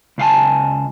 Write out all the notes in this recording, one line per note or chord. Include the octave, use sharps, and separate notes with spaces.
C#2 F5 G#5 A5